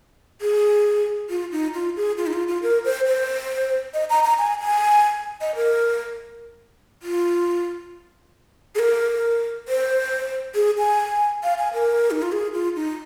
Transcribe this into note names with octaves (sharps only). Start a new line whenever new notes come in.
G#4
F4
D#4
F4
G#4
F4
D#4
F4
F4
A#4
C5
C5
D#5
A#5
A#5
G#5
G#5
D#5
A#4
F4
G#4
A#4
C5
G#4
G#5
F5
G#5
A#4
D#4
F4
G#4
F4
D#4